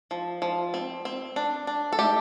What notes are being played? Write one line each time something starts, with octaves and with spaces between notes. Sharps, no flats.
F3
F3
C4
C4
D4
D4
A4
A3 G4